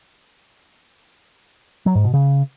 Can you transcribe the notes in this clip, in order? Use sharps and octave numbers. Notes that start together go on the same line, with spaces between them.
F#3
G#2
B2
C#3